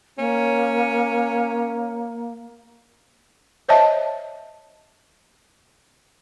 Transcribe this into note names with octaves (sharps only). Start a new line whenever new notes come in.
A#3 C#4
C5 C#5 D#5 E5 A5